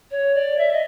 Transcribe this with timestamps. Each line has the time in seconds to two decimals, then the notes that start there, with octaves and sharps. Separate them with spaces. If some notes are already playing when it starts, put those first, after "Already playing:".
0.11 C#5
0.35 D5
0.58 E5
0.71 D#5